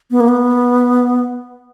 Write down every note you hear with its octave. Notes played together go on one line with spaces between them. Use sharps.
B3
A#3
B3